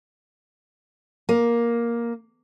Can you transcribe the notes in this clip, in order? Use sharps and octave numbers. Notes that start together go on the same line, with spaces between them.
A#3